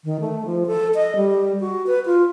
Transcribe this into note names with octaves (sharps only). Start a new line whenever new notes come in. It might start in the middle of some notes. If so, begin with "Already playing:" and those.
D#3
A3
F3
A4
D#5
G3
F#4
B4
F4